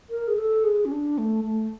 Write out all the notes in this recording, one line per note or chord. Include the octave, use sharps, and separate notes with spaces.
A#4
G#4
A4
G#4
C#4
D4
A3
A3